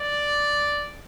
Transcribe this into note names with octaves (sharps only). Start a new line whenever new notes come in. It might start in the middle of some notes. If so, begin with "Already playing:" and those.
Already playing: D5